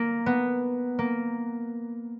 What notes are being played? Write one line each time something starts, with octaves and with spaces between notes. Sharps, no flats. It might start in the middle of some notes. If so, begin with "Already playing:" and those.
Already playing: A#3
B3
A#3